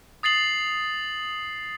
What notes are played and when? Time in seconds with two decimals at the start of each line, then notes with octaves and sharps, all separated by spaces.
0.23 D#6 A6 C7 F#7